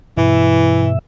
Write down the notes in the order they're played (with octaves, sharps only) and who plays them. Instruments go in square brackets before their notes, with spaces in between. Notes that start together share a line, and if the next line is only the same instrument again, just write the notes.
[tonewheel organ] G2 B2 E5 [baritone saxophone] E3